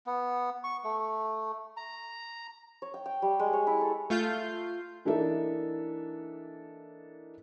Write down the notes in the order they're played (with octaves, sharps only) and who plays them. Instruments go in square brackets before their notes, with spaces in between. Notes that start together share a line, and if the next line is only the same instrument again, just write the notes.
[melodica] B3
C#6
A3
A#5
[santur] C#5
G5
G5
G3
G#3
C#5
E4
A4
[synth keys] A3 F4 F5 G6 C7
[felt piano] E3 A#3 D4 D#4 A4 E5